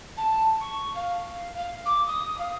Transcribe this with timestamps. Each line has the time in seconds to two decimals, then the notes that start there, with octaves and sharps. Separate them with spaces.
0.17 A5
0.60 C#6
0.94 F5
1.55 F5
1.85 D6
2.06 D#6
2.37 F5